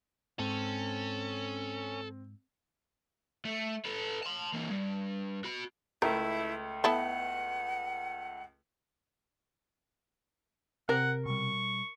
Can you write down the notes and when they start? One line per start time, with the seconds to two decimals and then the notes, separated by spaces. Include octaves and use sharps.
0.39 G#2 C4 C#4 A4
3.45 A3
3.85 A4 B4
4.23 A5 C6
4.53 E3 A#3
4.70 G2
5.44 F#4 B5
6.02 C#2 A3 E4 A#4
6.84 B3 E4 A4 F#5
10.89 C3 A#4 F#5
11.26 B2 G3 C#6